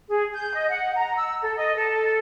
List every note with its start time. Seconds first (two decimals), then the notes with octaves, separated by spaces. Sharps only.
0.08 G#4
0.33 G6
0.54 D#5
0.70 F#5
0.96 A#5
1.16 E6
1.42 A4
1.57 D#5
1.76 A4